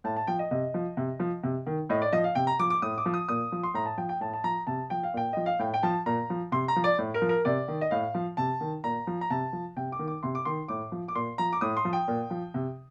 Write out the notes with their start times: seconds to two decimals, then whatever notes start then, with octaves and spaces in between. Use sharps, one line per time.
0.04 A2 A5
0.17 A5
0.27 F3 G5
0.39 D#5
0.51 C3 D#5
0.74 F3
0.97 C3
1.20 F3
1.43 C3
1.66 D#3
1.89 A2 D#5
2.02 D5
2.13 F3 D#5
2.24 F5
2.35 C3 G5
2.47 A#5
2.59 F3 D6
2.70 D6
2.82 A2 D#6
2.98 D6
3.06 F3
3.14 D#6
3.28 A#2 D#6
3.52 F3
3.63 C6
3.74 A2 A#5
3.86 A5
3.97 F3 G5
4.09 G5
4.21 A2 A5
4.34 A5
4.44 F3 A#5
4.67 C3 A5
4.90 F3 G5
5.03 F5
5.14 A#2 G5
5.33 F3 D#5
5.46 F5
5.59 A2 G5
5.74 G5
5.83 F3 A5
6.06 A#2 A#5
6.30 F3
6.52 C3 C6
6.68 A#5
6.76 F3
6.84 D5
6.98 A2
7.14 A#4
7.22 F3
7.29 A#4
7.45 C3 D5
7.68 D#3
7.81 D#5
7.91 A2 F5
8.14 F3
8.37 C3 A5
8.61 D#3
8.84 A#2 A#5
9.07 F3
9.21 A#5
9.30 C3 A5
9.53 F3
9.76 C3 G5
9.92 D6
9.99 D#3
10.07 D6
10.23 C3 C6
10.35 D6
10.45 D#3 C6
10.68 A2 D6
10.92 F3
11.08 D6
11.15 A#2 C6
11.38 F3 A#5
11.53 D6
11.61 A2 D#6
11.77 C6
11.85 F3
11.93 G5
12.08 A#2
12.30 F3
12.54 C3